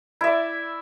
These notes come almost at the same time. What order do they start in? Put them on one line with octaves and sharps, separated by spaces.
E4 E5 D5